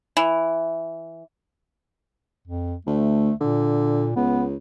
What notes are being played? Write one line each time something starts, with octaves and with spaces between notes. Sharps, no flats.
E3
F2
D2 A3
A#2 D3
C#2 B3